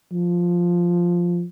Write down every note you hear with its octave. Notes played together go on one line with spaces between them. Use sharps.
F3